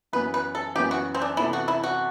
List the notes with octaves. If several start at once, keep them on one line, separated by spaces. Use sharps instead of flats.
F#2 E3 B3 B4
B4
A4
F#2 E3 B3 G4
F#4
C4
D4
C3 E3 B3 D4 E4 A4
F#4
E4
F#4